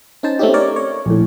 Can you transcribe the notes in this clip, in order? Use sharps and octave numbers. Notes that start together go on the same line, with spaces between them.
C#4 D#4 C5 A5
A3 C4 C#4 D#4 G4
A#4 C#5 D5
C#5
A#1 A2